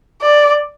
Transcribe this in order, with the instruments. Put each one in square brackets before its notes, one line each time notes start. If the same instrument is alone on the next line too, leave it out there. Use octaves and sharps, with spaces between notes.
[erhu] D5